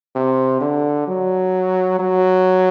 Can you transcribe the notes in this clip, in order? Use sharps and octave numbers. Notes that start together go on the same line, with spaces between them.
C3
D3
F#3
F#3